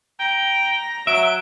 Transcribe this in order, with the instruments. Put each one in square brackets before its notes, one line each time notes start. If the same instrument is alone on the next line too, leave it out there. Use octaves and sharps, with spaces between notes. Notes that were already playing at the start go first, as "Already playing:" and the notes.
[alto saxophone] G5 [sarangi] A#5
[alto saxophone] F#3 [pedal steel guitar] E5 [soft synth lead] D7